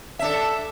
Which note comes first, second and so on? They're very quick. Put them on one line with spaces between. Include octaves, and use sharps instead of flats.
E5 D4 A4